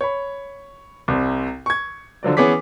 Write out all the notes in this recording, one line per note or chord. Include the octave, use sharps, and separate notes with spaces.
C#5 B5
C2 C3
C#6 G#6
D3 F3 F#3 D5
E3 B3 C#4 G#4 D6 B6